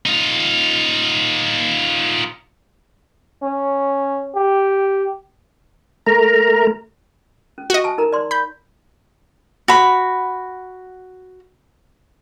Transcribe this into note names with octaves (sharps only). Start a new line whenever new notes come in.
D#4 F4
C#4
G4
A3 A#4 A#5
C#4
F#4 D#5
G#5 A5
D#4 A#4 A#5
D5 C6
B5 G6
F#4 B5